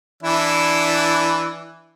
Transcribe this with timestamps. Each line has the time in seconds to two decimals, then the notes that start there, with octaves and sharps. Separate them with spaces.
0.23 E3 D4 E4